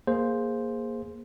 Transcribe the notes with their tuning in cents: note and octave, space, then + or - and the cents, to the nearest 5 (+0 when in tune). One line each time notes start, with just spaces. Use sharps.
A#3 +0 G#4 +0 C5 +0